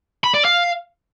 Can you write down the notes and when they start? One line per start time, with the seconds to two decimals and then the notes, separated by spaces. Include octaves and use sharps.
0.24 B5
0.34 D5
0.44 F5